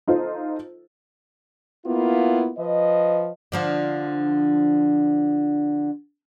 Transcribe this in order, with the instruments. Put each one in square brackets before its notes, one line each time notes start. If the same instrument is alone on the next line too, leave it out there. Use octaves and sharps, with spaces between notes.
[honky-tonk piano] D#4 F4 A4 C5
[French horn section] A#3 B3 E4 F4
F3 B4 D#5
[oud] D3 F3 D4